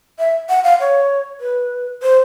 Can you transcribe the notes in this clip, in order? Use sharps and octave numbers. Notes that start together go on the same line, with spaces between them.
E5
F#5
F5
C#5
B4
C5